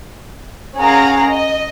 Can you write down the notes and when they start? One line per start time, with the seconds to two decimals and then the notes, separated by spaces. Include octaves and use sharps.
0.77 C#4 G#4 A#4 F5 F#5 A#5
1.28 D#5